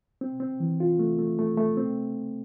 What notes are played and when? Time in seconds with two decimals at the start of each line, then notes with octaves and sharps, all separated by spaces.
0.21 C4
0.40 C4
0.60 E3
0.80 F4
0.99 A3
1.19 A3
1.39 A3
1.58 A3
1.77 C4